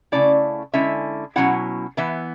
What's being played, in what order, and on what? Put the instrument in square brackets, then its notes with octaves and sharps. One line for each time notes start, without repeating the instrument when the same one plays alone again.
[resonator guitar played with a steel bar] C#3 F#3 A3 C#4 E4 D5
D3 G#3 C#4 E4 E5
B2 F#3 C#4 E4 F#5
E3 B3 E4 E5